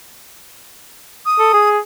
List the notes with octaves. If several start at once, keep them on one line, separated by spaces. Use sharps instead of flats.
D#6
A4
G#4